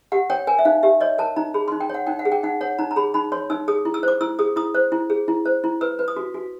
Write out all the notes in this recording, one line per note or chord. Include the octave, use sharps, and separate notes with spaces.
G4 F#5
C#5 G5
A#4 G#5
E5
D#4 F5
G4 E5
C#5 D#5
A#4 A5
D#4 A#5
G#4 B5
C6
D#4
G5
C#5 F#5
D#4 G5
F#5
G#4
G5
D#4 F#5
C#5 F#5
D#4 A#5
A#5
G#4 B5
D#4 B5
C#5 C6
D#4 E6
G#4 D#6
E4
E6
C5 D6
E4 E6
G#4 D#6
E4 D#6
C5
E4
G#4
E4
C5
E4
B4 E6
B4
D#6
F#4
F#4